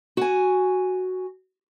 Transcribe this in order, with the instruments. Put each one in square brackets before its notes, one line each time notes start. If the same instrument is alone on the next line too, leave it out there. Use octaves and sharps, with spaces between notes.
[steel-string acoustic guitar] F#4 G#5